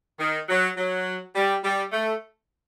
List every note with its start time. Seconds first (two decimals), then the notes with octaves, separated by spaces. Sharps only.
0.20 D#3
0.49 F#3
0.77 F#3
1.35 G3
1.64 G3
1.92 A3